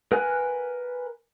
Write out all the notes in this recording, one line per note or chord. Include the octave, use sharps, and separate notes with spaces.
A#4 B4 F#5 G#5 F#6